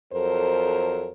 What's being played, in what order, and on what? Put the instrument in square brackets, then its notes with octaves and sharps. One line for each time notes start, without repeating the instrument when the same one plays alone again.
[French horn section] F2 F#3 A4 A#4 C5